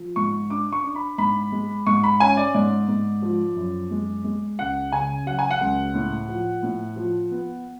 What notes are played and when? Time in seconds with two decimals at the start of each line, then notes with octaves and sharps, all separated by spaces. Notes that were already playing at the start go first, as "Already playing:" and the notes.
Already playing: F3
0.16 G#2 C#6
0.50 D4 D6
0.72 C#6
0.84 D4
0.96 B5
1.18 G#2 B5
1.52 G#3
1.87 G#2 C#6
2.03 B5
2.20 C#4 G#5
2.37 D5
2.54 G#2 D5
2.88 G#2
3.22 F3
3.56 F#2
3.91 G#3
4.24 G#3
4.58 C#2 F#5
4.92 C#3 G#5
5.26 F#3 F#5
5.39 G#5
5.51 F#5
5.60 C#2
5.94 A2
6.28 F3
6.63 A2
6.96 F3
7.31 B3